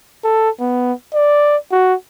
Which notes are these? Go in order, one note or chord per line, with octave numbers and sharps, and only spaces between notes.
A4
B3
D5
F#4